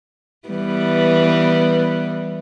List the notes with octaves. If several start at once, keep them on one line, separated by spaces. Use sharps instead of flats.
E3 G3 B3